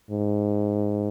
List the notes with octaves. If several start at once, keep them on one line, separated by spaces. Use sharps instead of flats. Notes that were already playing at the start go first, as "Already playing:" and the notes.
G#2